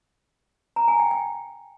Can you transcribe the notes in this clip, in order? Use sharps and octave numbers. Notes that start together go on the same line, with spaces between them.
A#5
G#5
G5
G5